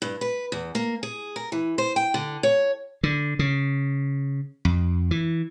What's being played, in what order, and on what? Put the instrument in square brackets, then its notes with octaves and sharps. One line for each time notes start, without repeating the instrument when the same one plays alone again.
[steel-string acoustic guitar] G2
B4
E2
A#3
G#4
A#4
E3
C5
G5
D3
C#5
[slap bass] D3
C#3
F2
E3